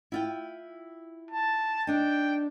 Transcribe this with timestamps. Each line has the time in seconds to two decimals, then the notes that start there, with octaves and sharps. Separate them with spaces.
0.12 E4 F4 G5
1.31 A5
1.87 D4 D#4 G5